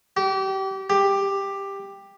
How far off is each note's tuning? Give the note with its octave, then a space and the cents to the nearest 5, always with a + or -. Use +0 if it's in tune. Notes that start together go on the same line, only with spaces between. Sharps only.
G4 -30
G4 +10